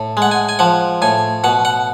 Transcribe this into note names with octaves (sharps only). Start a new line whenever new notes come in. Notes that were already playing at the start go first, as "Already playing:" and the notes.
Already playing: A2
G#3
F#5
G#5
G#5
F3 F#5
A2 G#5
B2 F#5
F#5